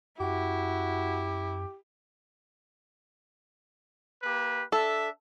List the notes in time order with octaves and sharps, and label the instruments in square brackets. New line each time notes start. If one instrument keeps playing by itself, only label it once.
[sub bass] F#2 [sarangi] E4 [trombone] F#4 [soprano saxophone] G4
[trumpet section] A#3 G4 B4
[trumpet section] D4 E5 [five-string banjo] A4